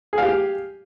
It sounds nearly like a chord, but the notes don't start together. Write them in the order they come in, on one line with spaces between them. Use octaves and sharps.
G#4 F5 G4